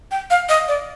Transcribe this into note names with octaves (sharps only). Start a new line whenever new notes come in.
G5
F5
D#5
D5